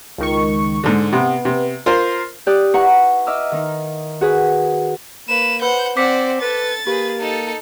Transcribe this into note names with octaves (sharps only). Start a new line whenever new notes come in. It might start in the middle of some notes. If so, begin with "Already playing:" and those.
C#2 D#3 C#6
G#2 D3
C3 B3
C3
F4 A#4 C5 C6
G4 D5 D#6 F#6
E4 B4 F#5 A#5 C#6
D#5 E5 D6 E6 F6
D#3 D#4
F#4 G#4 B4
A#3 B4 E7
B4 C5 F#5 B5 G6
C4 C5 D5 F#5 D6 B6
A4 B4 A6
A#3 G4 G#4 B4
D#4 A4